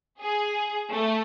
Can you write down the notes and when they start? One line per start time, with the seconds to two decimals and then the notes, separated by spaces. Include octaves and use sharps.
0.22 G#4
0.91 A3